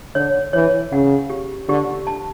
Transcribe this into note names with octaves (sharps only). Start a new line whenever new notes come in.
D3 C#5
E3 C#5
C#3 F#5
G4
D3 G4
A5